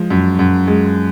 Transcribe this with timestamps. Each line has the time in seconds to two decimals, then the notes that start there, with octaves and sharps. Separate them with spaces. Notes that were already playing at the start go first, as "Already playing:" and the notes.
Already playing: F3 G#3
0.10 F#2
0.39 F#2
0.67 G#3